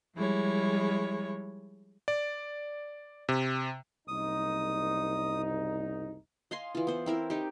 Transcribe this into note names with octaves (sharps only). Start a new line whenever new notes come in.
F3 G3 G#3 E4 C#5
D5
C3
F#1 C2 D#4 D#6
D#5 F5 G#5 C6
E3 F4
B3 C5
C4 E4 A#4
D#4 G4